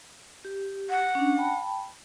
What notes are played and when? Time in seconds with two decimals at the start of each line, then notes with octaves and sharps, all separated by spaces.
0.45 G4
0.90 F#5
1.15 C#4 D4
1.37 G5 A5 B5